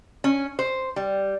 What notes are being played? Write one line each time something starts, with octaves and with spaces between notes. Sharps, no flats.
C#4
C5
G3